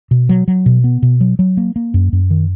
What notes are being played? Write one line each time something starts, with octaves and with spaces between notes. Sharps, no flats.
B2
F#3
F#3
B2
B3
B2
F#3
F#3
A#3
A#3
F#2
F#2
D#3